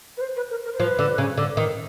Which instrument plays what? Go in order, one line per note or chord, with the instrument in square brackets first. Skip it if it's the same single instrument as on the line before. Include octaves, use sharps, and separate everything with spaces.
[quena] B4
C5
B4
A#4
A#4
C5
[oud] F3 [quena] B4
[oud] D3
C#3
D3
D#3